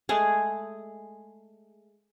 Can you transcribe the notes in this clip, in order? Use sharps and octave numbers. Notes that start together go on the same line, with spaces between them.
G#3 A3 G#4